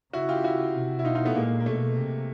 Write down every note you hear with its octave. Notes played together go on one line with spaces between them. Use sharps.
C#3 E4 F#4
F4 G4
E4 F#4
C3
E4
B2 D#4 F4
D#4 F4
A3 B3
A#2 G#3 A#3
A#3
B2 A3
C3